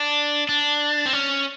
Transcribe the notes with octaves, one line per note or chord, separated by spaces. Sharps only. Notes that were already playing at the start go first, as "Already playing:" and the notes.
Already playing: D4
D4
C4
C#4